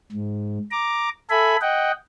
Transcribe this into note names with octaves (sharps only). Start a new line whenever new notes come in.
G#2
A#5 D6
A4 E5 G#5 B5
D#5 F#5 G5